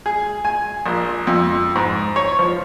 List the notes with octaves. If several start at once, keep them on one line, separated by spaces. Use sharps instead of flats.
G#4
G#5
A#1
F2
G#2
C#5
F3